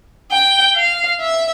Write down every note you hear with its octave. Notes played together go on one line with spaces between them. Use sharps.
G5
F5
E5